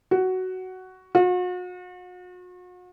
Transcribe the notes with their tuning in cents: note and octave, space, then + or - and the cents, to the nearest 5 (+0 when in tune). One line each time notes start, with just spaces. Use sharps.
F#4 +10
F#4 -40